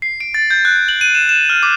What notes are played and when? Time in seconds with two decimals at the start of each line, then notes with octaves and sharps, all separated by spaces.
0.02 C7
0.20 D7
0.34 A6
0.50 G6
0.65 F#6
0.88 F#7
1.01 D#7
1.15 E7
1.29 E7
1.49 F6
1.63 D6